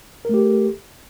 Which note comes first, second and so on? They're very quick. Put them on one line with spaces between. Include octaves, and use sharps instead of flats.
A#4 A3 G4 A4